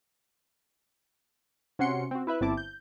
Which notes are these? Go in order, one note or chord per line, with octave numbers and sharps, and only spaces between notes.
C3 C#4 F#4 F#5 C6 C#7
C4 F#4
E4 B4 E5 F#6
G1 C4 E4 A5 D6
G6